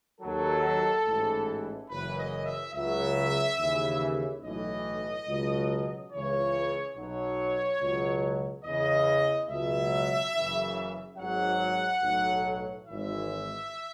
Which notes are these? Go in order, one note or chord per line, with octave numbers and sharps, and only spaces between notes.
D#2 D#3 F#3 A4
A1 G#2 E3
F#1 F#2 E3 B4
D#5
E5
C#2 C#3 F#3 E5
D#2 C#3 E3
B1 A2 E3 D#5
C#2 B2 F#3
C#2 C#3 E3 C#5
B1 B2 F#3 C#5
C#2 B2 F#3
E2 C#3 E3 D#5
C#2 B2 F#3 E5
F#1 F#2 C#3 E3
G#1 G#2 F#3 F#5
B1 A2 F#3
G#1 G#2 E3 E5